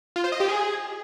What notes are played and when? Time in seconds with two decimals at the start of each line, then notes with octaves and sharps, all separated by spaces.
0.16 F4
0.24 C5
0.32 D#5
0.40 G4
0.48 G#4